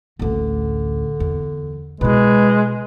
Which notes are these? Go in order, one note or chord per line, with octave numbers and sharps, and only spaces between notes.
A1 D2 D3
E2
B2 G#3 E4 B4